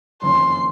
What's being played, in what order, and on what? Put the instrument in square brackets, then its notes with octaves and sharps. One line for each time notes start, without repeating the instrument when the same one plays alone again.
[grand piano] F#1 F2 D#3 A#3 C#4 [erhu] C6